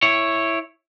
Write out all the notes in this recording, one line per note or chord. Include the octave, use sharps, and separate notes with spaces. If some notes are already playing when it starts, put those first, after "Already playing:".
E4 C#5